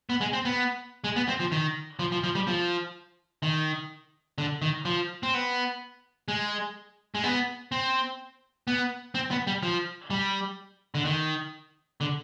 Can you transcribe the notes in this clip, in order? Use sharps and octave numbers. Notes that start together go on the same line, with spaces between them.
B3
G#3
C4
B3
G#3
B3
C4
F3
D#3
F3
F3
F3
G3
F3
D#3
D3
D#3
F3
C4
B3
G#3
G#3
B3
C4
B3
C4
B3
G3
F3
G3
D3
D#3
D3